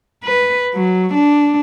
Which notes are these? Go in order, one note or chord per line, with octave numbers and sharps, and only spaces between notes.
B4
F#3
D4